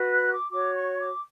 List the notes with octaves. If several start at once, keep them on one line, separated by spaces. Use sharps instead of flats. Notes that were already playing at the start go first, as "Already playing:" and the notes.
Already playing: F#4 B4
F#6
D6
F#4 C#5 D6
C#6
D6